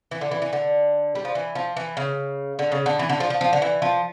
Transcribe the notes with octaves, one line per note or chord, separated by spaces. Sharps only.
E3
D3
E3
E3
D3
G3
F3
E3
F3
E3
C#3
D3
C#3
D3
E3
D3
F3
F3
F3
D3
E3
F3